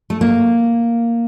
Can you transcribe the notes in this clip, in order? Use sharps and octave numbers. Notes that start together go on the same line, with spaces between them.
A3
A#3